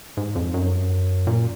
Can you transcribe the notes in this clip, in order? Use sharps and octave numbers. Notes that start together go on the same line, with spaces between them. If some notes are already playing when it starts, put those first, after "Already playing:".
G#2
F2
F#2
A#2